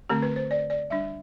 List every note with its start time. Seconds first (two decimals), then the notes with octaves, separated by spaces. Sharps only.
0.09 D3 A3 C4 G4
0.22 B4
0.36 C5
0.51 D5
0.70 D5
0.90 G3 D4 E5